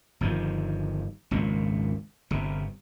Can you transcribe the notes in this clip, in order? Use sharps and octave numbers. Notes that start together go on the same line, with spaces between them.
G1 G2 D#3 F3
G#1 C#2 A#2
G1 C3